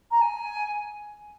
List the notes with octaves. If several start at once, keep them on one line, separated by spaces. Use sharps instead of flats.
A#5
G#5